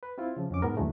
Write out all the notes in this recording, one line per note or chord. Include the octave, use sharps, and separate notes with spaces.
B4
C4 E4 F4
C#3 F3
F2 C#4 D6
G#2 B3 A#4
D#2 D3 E3 F#3 G#3 A3